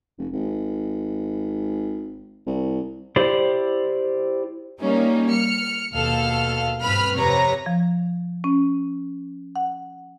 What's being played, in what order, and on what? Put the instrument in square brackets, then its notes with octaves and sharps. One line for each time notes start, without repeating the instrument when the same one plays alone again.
[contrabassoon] F1
G#1
C2
[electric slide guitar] E4 G4 C5 D5
[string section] G3 A#3 C#4 D#4
F6 C#7
D#2 B2 A4 F5 F6
G2 C4 B4 B5 F6
F2 C3 B4 C#5 A#5 A#6
[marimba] F3
C#4
F#5